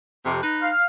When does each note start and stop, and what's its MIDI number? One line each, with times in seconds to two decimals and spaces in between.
0.24 0.42 41
0.24 0.42 48
0.43 0.70 63
0.43 0.70 71
0.62 0.85 77